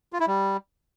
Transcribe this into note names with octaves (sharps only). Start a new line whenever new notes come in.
F4
E4
G3